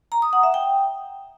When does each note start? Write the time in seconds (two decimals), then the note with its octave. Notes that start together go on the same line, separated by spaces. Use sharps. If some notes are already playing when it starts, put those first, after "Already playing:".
0.12 A#5
0.22 D#6
0.33 F#5
0.43 E5
0.54 G5